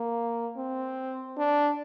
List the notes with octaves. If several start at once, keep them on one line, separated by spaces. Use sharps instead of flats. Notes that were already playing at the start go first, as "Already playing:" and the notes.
Already playing: A#3
C4
D4